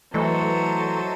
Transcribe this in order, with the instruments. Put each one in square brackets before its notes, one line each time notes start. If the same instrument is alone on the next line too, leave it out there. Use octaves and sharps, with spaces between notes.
[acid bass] E3 [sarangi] F#3 [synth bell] A3 A4 D#5 [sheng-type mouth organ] C5 E5 A5